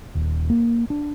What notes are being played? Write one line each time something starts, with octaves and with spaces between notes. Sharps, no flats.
D#1
A#3
D4